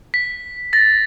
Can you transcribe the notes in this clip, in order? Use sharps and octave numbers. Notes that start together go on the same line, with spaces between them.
B6
A6 A#6